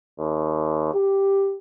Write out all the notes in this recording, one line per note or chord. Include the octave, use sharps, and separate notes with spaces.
D#2
G4